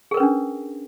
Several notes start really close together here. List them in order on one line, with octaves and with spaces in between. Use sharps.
G#4 A#4 B4 C#4 D4